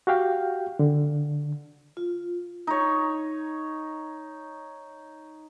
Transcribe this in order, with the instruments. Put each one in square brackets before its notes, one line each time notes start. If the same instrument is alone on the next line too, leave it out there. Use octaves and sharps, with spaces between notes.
[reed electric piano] F#4 G4 F5 G5
D3
[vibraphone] F4
[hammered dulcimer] D#4 C#5